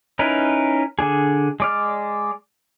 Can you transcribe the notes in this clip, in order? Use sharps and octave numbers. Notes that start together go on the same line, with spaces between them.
C#4 D#4 E4 A#4 B4
D3 D4 G#4
G#3 D5 F6